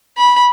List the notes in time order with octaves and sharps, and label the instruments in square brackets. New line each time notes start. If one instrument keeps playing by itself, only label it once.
[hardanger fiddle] B5